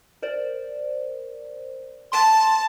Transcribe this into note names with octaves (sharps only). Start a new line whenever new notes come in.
A#4 C5 D5
A5 C6